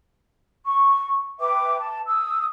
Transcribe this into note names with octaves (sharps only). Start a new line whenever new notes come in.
C#6
B4 E5 G5 D6
A5
D#6 E6